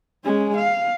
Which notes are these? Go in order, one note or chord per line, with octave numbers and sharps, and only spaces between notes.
G#3 C#4
F5